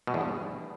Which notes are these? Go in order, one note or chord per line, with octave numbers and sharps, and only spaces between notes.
B2
E2
G2